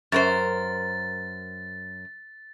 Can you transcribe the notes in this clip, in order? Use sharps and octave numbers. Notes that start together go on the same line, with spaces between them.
F#2 A#4 C5 A6